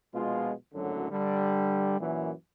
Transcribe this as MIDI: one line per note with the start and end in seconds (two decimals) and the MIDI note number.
0.14 0.53 34
0.14 0.53 47
0.14 0.53 56
0.14 0.53 65
0.74 1.10 32
0.74 1.10 42
0.74 1.10 45
0.74 1.10 50
0.74 1.10 54
1.11 1.98 43
1.11 1.98 50
1.11 1.98 55
2.00 2.32 42
2.00 2.32 46
2.00 2.32 52